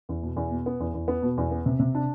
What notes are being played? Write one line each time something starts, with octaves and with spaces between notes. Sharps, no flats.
E2
B2
E2
B2
B3
E2
E2
B3
B2
E2
B3
C3
C3
D4